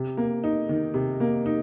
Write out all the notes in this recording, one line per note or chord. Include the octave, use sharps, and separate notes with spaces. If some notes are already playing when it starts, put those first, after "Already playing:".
Already playing: C3
A#3
D#4
D#3
C3
A#3
D#4